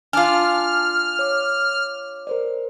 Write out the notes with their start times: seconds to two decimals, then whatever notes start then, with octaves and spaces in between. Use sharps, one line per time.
0.13 D4 F4 G#5 A5 D6 F6
1.19 C#5 D6
2.27 A#4 C5 D5